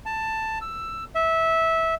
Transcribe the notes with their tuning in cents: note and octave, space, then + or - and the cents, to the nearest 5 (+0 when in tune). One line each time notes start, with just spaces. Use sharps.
A5 +10
E6 +10
E5 -15